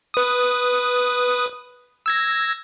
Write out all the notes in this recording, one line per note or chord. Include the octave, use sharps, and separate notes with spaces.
B4 D#6
E6 G#6 A#6